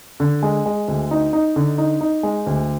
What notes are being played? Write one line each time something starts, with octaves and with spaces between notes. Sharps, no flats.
D3
G#3
G#3
D2
D#4
D#4
D3
D#4
D#4
G#3
D2